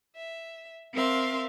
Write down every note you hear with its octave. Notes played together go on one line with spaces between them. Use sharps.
E5
C4 A#4 E5 F5 C6